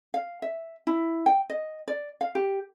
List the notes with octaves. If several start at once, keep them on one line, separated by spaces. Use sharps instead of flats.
F5
E5
E4
G5
D#5
D5
F5
G4